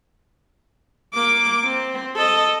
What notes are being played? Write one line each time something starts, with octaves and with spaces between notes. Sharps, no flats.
A#3 D6
C4
A4 D#5